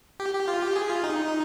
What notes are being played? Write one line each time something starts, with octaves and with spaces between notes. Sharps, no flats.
G4
G4
F4
G4
G#4
F4
D#4